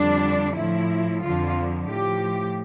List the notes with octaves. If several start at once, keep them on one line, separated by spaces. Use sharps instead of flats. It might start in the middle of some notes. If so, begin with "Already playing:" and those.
Already playing: F2 D3 G3 D4
A2 F3 E4
F2 D3 F3 F4
A2 F3 G4